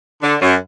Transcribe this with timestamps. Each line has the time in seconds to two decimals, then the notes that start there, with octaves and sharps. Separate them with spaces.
0.22 D3
0.41 F#2